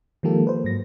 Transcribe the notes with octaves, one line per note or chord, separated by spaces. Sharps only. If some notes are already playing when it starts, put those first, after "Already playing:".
D#3 F3 G#3 A#3 G4 A4
B4 C5
G#2 F#3 A#6